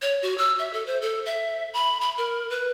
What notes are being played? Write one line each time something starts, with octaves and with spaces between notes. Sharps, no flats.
C#5
F#4
E6
E5
A4
C5
A4
E5
B5
B5
A#4
B4